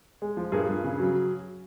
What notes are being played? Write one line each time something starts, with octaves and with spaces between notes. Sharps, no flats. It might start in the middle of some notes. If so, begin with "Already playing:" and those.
G#3
F3
G2 G#4 A#4
G2
C#3
F#3